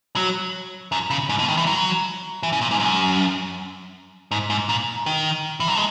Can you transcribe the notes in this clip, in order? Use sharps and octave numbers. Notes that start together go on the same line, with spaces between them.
F#3
F#2
C#3
G#2
B2
D#3
E3
F#3
E3
C#3
A#2
G#2
F#2
G#2
G#2
A#2
D#3
E3
F#3
G#3